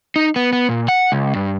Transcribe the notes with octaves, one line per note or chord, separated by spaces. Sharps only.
D#4
B3
B3
A#2
F#5
C#2
G2